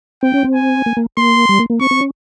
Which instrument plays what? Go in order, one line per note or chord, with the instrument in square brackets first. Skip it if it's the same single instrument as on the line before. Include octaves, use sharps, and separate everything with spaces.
[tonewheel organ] C4 [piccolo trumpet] G5
[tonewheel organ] C#4
C4
[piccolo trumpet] G#5
[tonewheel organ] A#3
A#3
[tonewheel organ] A#3 [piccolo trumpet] C6
[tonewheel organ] G3
A#3
A#3
[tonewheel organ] C4 [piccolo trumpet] C#6
[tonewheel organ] C4
C#4